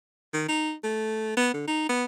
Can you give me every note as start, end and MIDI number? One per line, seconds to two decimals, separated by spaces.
0.34 0.45 51
0.48 0.73 63
0.84 1.35 57
1.37 1.53 59
1.54 1.66 50
1.67 1.87 63
1.89 2.05 59